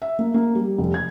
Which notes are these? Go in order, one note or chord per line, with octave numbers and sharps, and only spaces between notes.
E5
A#3
A#3
G3
F1
G#6